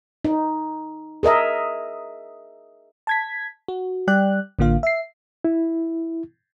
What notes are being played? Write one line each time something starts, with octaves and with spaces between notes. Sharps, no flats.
D#4
G#4 A#4 D#5 E5
A5 G#6 B6
F#4
G3 D5 G5 F#6
A1 D3 A#3 F4 F5
E5 C7
E4